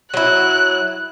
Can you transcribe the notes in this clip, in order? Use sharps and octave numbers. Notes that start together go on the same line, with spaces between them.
F#3 E4 F#6